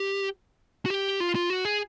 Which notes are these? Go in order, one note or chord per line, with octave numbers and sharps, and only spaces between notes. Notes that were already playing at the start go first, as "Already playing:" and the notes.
Already playing: G4
F#4
G4
F4
F4
F#4
G#4